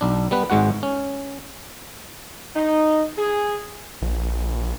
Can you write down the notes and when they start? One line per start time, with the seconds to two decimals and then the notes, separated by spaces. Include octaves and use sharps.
0.01 B1 D4
0.31 G3 B3 B4
0.50 G#1 G#2 G#3 F#4 F#5
0.83 C#4
2.56 D#4
3.17 G#4
4.02 A#1